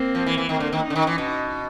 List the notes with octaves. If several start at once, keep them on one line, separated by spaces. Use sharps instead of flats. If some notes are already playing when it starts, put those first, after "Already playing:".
Already playing: A#3 C4
F3
E3
E3
D#3 A#3 C4
D3
D#3
C#4 D#4
D3
D#3
E3
B2